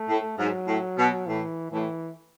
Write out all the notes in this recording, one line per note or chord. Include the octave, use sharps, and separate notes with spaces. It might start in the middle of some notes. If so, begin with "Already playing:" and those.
Already playing: A3
A2
G#2 F#3
A2
B2
A2 E3
A2 E3